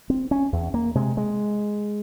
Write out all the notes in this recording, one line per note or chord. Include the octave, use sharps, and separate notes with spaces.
C4
C#4
E2
A#3
C3 G#3
G#3